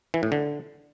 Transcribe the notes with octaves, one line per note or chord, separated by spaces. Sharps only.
E3
A2
D3